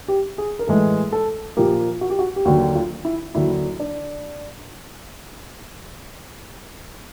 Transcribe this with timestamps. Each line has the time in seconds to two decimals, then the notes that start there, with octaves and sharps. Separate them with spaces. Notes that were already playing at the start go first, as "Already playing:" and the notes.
0.08 G4
0.38 G#4
0.59 A#4
0.67 A2 E3 G#3 A4
1.12 A4
1.57 A#2 F3 A#3 G4
2.01 F#4
2.10 G4
2.19 F#4
2.36 G4
2.45 D#2 D3 F#3 F#4
2.75 F4
3.05 E4
3.35 D#2 D3 F#3 E4
3.80 D4